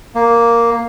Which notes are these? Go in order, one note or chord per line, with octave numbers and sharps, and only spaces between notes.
A#3